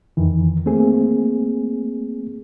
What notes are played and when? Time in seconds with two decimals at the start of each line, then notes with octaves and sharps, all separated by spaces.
0.17 F2 D#3 E3
0.66 A3 A#3 C4 G#4